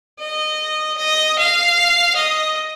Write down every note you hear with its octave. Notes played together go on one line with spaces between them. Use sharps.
D#5
D#5
F5
D#5